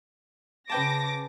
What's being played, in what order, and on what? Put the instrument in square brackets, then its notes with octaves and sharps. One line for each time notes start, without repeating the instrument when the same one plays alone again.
[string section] C#3 D6 A#6 [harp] B4 G5 A5